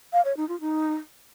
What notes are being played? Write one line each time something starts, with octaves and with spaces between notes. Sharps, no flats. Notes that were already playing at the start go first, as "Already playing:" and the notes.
F5
C#5
D#4
F4
D#4